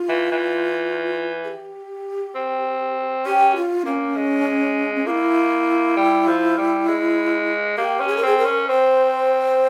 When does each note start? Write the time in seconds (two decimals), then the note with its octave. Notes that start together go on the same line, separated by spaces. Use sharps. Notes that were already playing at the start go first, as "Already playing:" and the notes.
Already playing: F4
0.09 E3
0.32 E3
1.44 G#4
1.48 G4
2.35 C4
3.26 C#4 G4
3.56 F4
3.86 A#3 C#4
4.16 G#3
4.95 C#4
5.06 A#3 E4 F4
5.97 G3
6.27 F3
6.58 G3
6.87 G#3
7.78 A#3 G4
8.00 C#4
8.08 G#4
8.17 A#4
8.23 C4 G#4
8.38 A#4
8.45 C#4
8.69 C4 C5